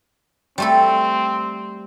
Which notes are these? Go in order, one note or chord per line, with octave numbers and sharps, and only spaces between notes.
G3 A3 C4 A4